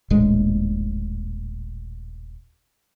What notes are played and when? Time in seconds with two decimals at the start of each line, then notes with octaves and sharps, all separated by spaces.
0.10 D#1 A#1 A2 G#3